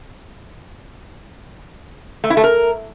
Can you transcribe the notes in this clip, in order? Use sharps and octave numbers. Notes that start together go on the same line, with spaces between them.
A3
E4
A3
A#4